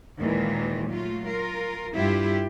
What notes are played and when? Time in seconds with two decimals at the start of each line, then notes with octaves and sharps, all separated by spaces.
0.18 D#2 A#2 D#3 E3 G#3
0.92 F#3 A3 F4
1.25 F4 A#4
1.93 G2 E4 F4 G4